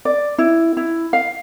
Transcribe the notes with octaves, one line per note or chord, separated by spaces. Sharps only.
D5
E4
E4
F5